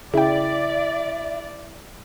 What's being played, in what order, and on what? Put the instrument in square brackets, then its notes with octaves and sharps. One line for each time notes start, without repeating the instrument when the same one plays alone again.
[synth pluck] C#3 G5 [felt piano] E4 [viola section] D5 [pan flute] E5